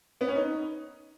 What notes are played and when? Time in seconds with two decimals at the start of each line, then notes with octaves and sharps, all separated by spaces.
0.21 B3
0.28 C#4
0.36 D#4